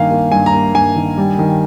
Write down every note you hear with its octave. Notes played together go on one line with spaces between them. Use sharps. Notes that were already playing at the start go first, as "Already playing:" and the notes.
Already playing: G2 D#3 A#3 F5 G#5
A#3
G2 G#5
A#5
A#3
G2 G#5
D#3
G3
D#3